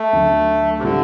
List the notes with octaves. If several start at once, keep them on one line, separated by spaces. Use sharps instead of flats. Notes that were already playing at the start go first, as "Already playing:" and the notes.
Already playing: A3
D2 D3 F#3
C3
A2 D3 G3 C4 E4